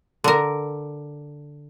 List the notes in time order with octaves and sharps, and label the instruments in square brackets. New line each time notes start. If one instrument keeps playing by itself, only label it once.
[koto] D3 A#4